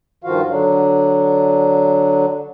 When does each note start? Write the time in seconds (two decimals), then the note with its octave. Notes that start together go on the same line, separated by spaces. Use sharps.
0.24 G2 D#3 F3 F4 F#4 F5
0.49 D3 F#3 D4